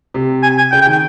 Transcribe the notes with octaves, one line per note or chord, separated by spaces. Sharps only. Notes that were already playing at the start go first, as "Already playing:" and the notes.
C3
G#5
G#5
C#3 G5
G5
D#3
G5